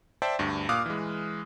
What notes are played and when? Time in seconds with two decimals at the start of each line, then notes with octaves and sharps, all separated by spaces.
0.22 C5 D5 E5 G5 A5
0.39 D2 G2
0.69 A#2 F5 D6 D#6 F6 F#6
0.86 E3 G#3